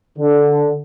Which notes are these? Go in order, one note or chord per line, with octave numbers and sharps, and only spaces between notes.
D3